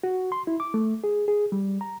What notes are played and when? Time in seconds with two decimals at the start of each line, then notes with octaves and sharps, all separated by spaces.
0.04 F#4
0.32 C6
0.47 E4
0.60 D6
0.74 A3
1.04 G#4
1.28 G#4
1.52 G3
1.81 A#5